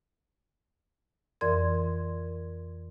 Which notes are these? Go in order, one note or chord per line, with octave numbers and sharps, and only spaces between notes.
F2 E3 A#4 D5 C6 G#6